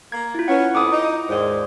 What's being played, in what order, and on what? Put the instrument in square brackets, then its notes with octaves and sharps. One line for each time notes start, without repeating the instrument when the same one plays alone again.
[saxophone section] A#3 [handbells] G#6
[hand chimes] E4 F4
[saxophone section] C#4 [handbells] B4 F#5
[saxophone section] F2 B3 [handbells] D6 D#6
[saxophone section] D#4
[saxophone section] D#2 G#2 [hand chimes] C5 D5